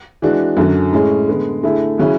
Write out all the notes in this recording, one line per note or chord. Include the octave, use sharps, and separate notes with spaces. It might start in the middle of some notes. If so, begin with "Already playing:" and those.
E3 G#3 D4 F#4
F#2 D3 F#3
A2 G#3 C#4 G#4
D3 G#3 B3
D3 A3 E4 G#4
C#3 F#3 C#4 E4 G#4